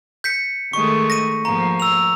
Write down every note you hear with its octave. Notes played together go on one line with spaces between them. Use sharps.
G6 B6 C#7
D#3 G#3 A3 C#6
A#6 D#7
G#2 F3 A#3 A#5
E6 F7